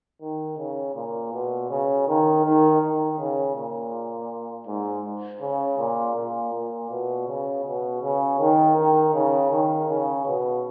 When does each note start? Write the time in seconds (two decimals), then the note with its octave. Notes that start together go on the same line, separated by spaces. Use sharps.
0.21 D#3
0.58 C#3
0.95 A#2
1.33 B2
1.70 C#3
2.08 D#3
2.44 D#3
2.82 D#3
3.19 C#3
3.56 A#2
4.67 G#2
5.41 C#3
5.79 A#2
6.16 A#2
6.54 A#2
6.90 B2
7.28 C#3
7.65 B2
8.02 C#3
8.40 D#3
8.77 D#3
9.14 C#3
9.51 D#3
9.89 C#3
10.26 B2